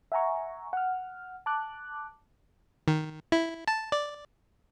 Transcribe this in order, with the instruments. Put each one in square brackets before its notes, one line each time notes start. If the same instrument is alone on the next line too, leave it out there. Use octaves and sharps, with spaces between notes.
[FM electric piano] E5 F#5 G#5 A#5 C#6
F#5 F6
A5 D6 F#6
[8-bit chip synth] D#3
E4
A5
D5